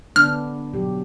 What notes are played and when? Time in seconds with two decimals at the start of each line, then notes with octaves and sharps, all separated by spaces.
0.16 D3 B3 D4 F6
0.74 B2 F#3 G4